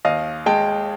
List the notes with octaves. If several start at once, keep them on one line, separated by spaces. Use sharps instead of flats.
D#2 D#5 F5
G#3 G5 A5